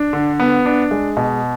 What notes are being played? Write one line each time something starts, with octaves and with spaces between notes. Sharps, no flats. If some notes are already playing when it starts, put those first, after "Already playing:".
Already playing: D4
D3
B3
D4
G#3
B2